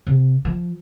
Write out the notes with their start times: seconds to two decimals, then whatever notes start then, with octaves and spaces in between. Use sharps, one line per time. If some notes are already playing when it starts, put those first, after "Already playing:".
0.07 C3
0.45 F3